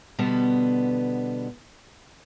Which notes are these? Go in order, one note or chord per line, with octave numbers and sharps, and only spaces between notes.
B2 D3 G3 B3